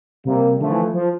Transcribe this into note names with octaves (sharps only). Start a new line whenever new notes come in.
C3 G3 A#3
D3 F3 A3
E3
F3